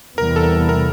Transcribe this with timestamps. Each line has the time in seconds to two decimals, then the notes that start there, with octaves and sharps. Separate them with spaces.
0.18 E2 C3 E3 G3 B3 A#4
0.36 A4
0.43 A#4
0.69 A#4